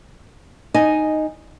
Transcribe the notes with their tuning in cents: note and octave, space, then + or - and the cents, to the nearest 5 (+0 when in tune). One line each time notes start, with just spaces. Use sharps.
D#4 -5 D#5 +0 G#5 +0